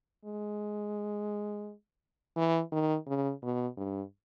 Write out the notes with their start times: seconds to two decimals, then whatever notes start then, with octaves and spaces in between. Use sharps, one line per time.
0.24 G#3
2.36 E3
2.72 D#3
3.07 C#3
3.42 B2
3.77 G2